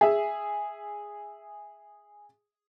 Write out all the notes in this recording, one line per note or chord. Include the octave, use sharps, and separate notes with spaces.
G#4 E5